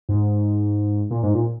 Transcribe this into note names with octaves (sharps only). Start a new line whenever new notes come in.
G#2
A#2
G#2
A#2